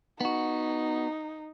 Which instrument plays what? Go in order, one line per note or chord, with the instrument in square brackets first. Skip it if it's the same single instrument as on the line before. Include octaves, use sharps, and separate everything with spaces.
[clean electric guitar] B3 F#4 [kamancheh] D#4